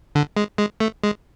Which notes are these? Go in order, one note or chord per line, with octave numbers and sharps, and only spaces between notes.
D3
G#3
G#3
A3
G#3